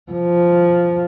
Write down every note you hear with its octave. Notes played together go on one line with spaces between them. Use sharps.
F3